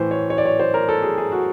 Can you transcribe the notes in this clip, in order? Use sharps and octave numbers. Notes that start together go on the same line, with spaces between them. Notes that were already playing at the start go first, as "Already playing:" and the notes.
Already playing: A2 E3 C5
C#5
C#5
D5
C#5
C5
A#4
A4
G#4
G#4
F#4